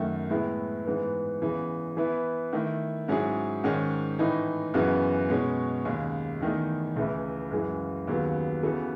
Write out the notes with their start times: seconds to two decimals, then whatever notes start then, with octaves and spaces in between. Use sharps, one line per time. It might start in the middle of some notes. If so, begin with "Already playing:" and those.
Already playing: F#2 D#3 A3
0.30 A2 G#3 B3 E4
0.85 G#2 E3 B3
1.42 E2 C#3 E3
1.97 E3 B3 E4 B4
2.53 D#3 A3 E4
3.08 G#2 F#3 C#4 E4 G#4
3.64 G#2 D#3 G#3 C#4
4.19 A2 E3 A3 D#4
4.74 F#2 C#3 E3 B3 F#4
5.30 B2 G#3 C#4
5.85 D#2 C#3 G#3
6.41 E2 D#3 A3 D#4
6.96 C#2 C#3 E3 A3 E4
7.51 F#2 C#3 E3 G#3
8.07 D#2 C#3 F#3 B3
8.63 C#3 E3 B3 F#4 A4